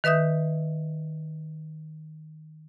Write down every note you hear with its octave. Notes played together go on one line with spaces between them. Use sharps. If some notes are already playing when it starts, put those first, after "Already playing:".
D#3 B4 E5 D#6 G6